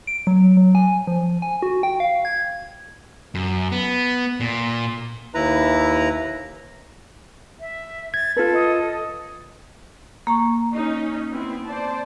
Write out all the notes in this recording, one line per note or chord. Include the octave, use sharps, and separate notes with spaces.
D7
F#3
F#3
G#5
F3
G#5
F#4
G5
F5
G#6
F#2
B3
A#2
D#2 E4 B4 A#5
E5
G#6 A6
F4 A4 B4
D#5
A#3 A#5 C#6
C#4 D#4
B3 C4 E4
C5 D5 A5